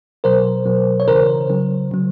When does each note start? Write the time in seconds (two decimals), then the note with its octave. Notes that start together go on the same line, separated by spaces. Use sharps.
0.24 B2 F#3 A#4 C5
0.66 B2 F#3
1.00 C#5
1.08 C#3 E3 A#4 C5
1.50 C#3 F#3
1.91 C#3 F#3